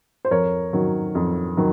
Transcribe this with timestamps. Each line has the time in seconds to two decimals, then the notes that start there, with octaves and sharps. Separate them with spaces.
0.25 C5
0.31 F2 A#4 C#5
0.73 D#3 F#3
1.15 F2
1.57 D#3 F#3